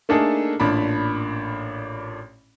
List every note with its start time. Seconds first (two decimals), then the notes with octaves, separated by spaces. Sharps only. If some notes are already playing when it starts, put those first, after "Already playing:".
0.09 A3 A#3 D4 D#4 G#4 A4
0.60 A1 A#2 D4 B5